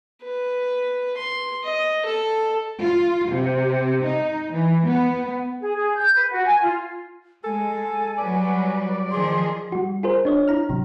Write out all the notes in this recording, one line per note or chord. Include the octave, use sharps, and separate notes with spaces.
B4
C6
D#5
A4
F4
C3
D#4
E3
B3
G#4
G#4
G6
B4
F#4
G#5
F4
G#3 A4 G#5
F#3 G3 B4 D5
D#3 F3 G#4 C6
G3 F#4
F4 G#4 A#4 C5
D4 C#5 D#5
E4 A#5 F6
G#1 C3 F#3